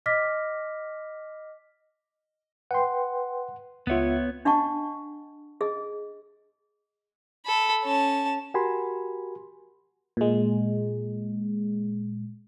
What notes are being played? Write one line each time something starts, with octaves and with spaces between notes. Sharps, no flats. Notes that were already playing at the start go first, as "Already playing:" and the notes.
D#5 D6 F6 A#6 B6
B4 F#5 G5 C6
C#2 B3 F4 C#5 E5 F#5
D4 D#5 F#5 A5 C#6
G#4 D#5
A4 B5
C#4 A5
F#4 G4 A#4 G#5 B5 C6
A#2 G#3